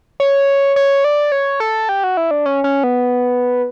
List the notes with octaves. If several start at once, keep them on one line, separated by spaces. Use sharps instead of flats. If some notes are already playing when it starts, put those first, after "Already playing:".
C#5
C#5
D5
C#5
A4
G4
F#4
E4
D4
C#4
C#4
B3